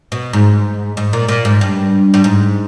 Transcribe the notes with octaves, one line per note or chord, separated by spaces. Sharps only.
B2
G#2
G#2
A#2
A#2
G#2
G2
G2
G#2